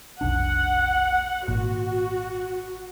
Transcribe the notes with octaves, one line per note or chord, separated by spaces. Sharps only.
F1 B1 D4 F#5
G#1 A#2 F#4